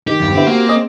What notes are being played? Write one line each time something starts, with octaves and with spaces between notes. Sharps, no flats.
D#3 G4
E2 G2
D3 B3 C4 E4
A#3 F#4 G4
C#4 G#4 D#5